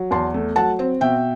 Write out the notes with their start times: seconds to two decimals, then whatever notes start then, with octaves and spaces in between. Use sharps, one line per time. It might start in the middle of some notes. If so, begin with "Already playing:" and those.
Already playing: F#3
0.11 E2 A5 C6
0.34 A3
0.56 F#3 F#5 A5
0.79 C4
1.01 B2 E5 G5